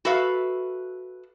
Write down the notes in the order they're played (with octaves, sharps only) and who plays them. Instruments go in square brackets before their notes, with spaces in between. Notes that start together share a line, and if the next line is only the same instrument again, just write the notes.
[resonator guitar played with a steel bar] F#4 A4 B4 E5 F5